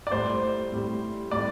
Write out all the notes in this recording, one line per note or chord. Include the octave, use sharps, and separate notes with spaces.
D5
A2 G3 C5
A2 G3
A2 G3 D5